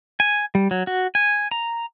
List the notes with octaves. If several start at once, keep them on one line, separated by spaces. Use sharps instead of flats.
G#5
G3
F#3
F#4
G#5
A#5